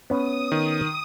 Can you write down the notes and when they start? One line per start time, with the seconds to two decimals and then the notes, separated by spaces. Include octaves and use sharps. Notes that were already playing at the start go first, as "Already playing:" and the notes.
0.10 B3 C#4 D#6
0.52 D#3